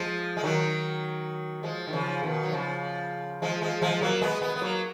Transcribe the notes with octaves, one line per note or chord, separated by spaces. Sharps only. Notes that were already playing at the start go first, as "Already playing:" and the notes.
Already playing: F3 G#3
G#3
D#3 F#3
F3 G#3
D#3
C#3 F3
B2 D#3
F#3
C#3 F3
F3 G#3
F3 G#3
F3 G#3
F#3 A#3
G#3 B3
G#3 B3
B3
F#3 A#3